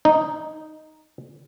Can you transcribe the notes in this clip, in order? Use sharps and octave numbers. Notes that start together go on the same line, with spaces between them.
D#4